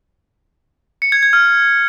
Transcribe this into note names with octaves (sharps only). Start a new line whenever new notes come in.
C#7
G#6
G#6
F6